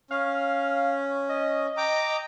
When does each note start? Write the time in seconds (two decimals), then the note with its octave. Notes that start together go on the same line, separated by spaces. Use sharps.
0.11 C#4 F5
1.29 D#5
1.77 G5 A#5 D6